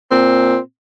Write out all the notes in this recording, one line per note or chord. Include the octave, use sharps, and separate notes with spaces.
A#2 C4